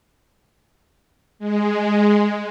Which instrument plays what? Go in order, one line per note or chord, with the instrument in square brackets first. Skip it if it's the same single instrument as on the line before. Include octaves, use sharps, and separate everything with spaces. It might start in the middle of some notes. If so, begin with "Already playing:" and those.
[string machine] G#3